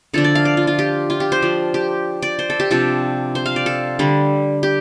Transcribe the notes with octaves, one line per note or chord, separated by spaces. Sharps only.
D3 F3 D4 A4
D5
F5
D5
F4
F4
G4
F4
G4
C5
F3 D4
G4
D5
C5
A4
G4
C3 F3 D4 A4
C5
F5
D5
A4
D3 G3 D4
G4